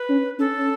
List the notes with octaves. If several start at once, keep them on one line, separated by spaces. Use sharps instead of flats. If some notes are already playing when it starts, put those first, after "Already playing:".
Already playing: B4
C#4
C#4 A4
C#4